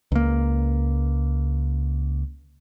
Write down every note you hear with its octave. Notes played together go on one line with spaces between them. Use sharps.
C#2 A#3